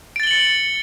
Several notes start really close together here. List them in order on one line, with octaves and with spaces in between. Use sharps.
D7 A6 G7 F#7 C#7